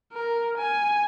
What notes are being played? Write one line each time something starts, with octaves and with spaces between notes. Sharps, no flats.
A#4
G#5